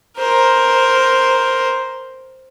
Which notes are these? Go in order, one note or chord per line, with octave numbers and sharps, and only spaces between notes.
A#4 C5